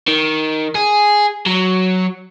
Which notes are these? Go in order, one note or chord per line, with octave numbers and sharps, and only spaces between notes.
D#3
G#4
F#3